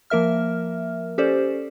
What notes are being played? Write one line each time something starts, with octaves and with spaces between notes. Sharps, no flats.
F3 A#3 A#4 E5 F6
C#4 G4 A4 C5 D5